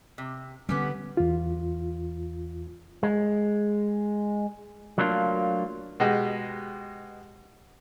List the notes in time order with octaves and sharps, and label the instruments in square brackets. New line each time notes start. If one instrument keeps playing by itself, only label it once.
[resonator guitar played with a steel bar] C3
[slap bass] D3 G3 [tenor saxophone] B3 [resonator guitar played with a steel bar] C#4 G4 F#5
[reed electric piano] E2 F4
[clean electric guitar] G#3
F#3 A3 A#3 D4 F4
[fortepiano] B2 G#3 G4